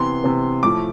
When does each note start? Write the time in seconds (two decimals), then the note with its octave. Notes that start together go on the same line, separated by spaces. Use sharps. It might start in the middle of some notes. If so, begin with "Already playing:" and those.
Already playing: C3 E3 B3 C6
0.24 C3 E3 B3
0.63 A2 F3 A3 D6